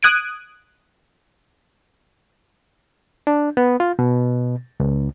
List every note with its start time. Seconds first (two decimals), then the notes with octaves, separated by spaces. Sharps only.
0.03 D#6 F#6 G#6 D7 D#7
3.27 D4
3.57 B3
3.80 F4
3.99 B2
4.80 C#2